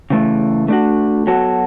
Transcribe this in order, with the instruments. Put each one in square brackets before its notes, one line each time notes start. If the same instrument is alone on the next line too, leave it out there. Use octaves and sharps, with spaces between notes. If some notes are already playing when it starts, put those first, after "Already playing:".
[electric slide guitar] C#3 E3 A3
A3 D4 F#4
F#3 B3 F#4 A4